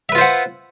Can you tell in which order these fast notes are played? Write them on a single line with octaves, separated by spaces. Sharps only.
E5 B4 F4 C5 F#5